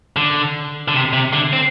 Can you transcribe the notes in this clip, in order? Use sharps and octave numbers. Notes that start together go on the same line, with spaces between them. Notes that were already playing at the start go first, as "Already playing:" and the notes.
D3
D3
C3
C3
D3
C4